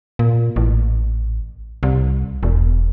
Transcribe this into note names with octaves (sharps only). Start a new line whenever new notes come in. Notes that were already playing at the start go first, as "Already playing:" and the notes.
A#2
A1
C2
E1